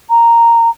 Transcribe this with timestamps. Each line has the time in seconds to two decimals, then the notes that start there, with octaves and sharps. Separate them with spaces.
0.09 A#5